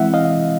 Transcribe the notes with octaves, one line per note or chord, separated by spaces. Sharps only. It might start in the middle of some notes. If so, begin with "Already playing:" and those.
Already playing: E3 G#3 C4 E4 E5 F#5
D#5 F5